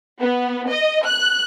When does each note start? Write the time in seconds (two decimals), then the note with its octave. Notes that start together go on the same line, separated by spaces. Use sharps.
0.21 B3
0.69 D#5
1.06 F#6